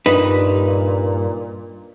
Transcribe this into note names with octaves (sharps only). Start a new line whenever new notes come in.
G2 A#2 D#4 B4